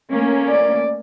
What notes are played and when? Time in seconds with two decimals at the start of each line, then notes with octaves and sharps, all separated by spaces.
0.12 A3 A#3 C#4
0.49 D5